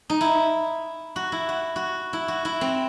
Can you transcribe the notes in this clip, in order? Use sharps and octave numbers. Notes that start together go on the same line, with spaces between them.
D#4
E4
F#4
E4
F#4
F#4
E4
F#4
E4
C4